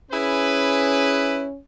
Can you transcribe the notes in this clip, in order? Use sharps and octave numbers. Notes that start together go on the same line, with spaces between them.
C#4 E4 G#4 B4